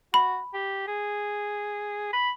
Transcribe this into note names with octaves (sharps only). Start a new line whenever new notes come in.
F#4 B5
G4
G#4
B5